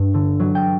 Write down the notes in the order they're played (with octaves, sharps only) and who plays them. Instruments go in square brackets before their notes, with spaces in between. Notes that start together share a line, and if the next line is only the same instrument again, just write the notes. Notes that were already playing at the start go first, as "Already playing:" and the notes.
Already playing: [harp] G2
D3
F#3
G5